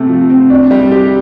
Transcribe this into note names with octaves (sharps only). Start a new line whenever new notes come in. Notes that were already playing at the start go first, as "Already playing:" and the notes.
Already playing: C3 A3 C4
F3
C4
D4
G3
G4